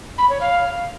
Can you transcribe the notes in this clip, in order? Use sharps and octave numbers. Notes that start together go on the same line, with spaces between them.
B5
C#5
F5